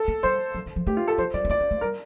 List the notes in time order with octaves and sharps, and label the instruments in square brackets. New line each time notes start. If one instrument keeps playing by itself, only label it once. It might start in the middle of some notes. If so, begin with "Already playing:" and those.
Already playing: [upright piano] A4
[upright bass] A#3
[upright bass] G3 [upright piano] C5
[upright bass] F3
D#3
F3
[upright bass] A3 [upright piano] G4
[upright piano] F4
A4
[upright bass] F3 [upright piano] C5
[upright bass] G3 [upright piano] D5
[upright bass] C4
[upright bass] A#3 [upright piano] D5
[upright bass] C4
A3
[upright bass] G3 [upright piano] A#4